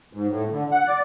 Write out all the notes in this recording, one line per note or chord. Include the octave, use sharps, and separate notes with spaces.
G#2
A2
D3
F#5
D5